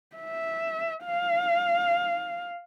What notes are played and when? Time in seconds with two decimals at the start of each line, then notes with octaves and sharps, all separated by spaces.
0.16 E5
1.05 F5